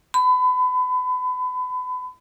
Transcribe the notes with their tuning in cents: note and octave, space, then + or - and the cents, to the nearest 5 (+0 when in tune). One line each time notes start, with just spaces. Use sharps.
B5 +30